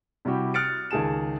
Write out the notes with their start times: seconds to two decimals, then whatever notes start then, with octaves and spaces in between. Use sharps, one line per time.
0.25 C3 G3 E4 F#4 G4
0.54 D#6 F6 F#6 A6 C#7 D7
0.91 C#2 D#3 G#4 A5 E7